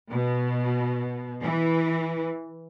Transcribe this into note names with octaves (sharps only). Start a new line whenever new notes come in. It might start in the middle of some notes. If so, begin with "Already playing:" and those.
B2
E3